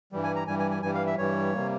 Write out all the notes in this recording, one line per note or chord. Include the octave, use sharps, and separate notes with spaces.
G2 E3 G3
G#5
A#5
G2 E3 G3 G#5
G#5
G#5
G2 E3 G3 G#5
F5
E5
G2 E3 G3 C#5
C3 G3 A#3